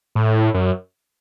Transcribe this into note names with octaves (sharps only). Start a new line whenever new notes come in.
A2
F#2